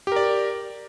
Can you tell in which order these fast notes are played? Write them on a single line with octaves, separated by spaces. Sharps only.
G4 A#4 D5